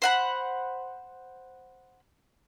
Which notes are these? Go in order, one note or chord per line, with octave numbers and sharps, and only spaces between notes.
C5 F#5 B5